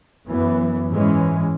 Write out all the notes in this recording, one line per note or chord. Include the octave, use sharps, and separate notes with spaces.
F#2 E3 B3
G#2 E3 G#3 C#4